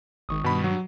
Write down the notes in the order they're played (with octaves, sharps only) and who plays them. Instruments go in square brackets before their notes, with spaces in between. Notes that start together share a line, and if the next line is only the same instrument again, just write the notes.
[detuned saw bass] G#1 [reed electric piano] D#3 C#6 D#6
[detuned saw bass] G2 [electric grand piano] B2 B5
[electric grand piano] F#3